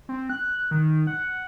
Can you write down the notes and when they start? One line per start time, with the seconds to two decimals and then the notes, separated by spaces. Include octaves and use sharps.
0.09 C4
0.30 F#6
0.71 D#3
1.07 F#5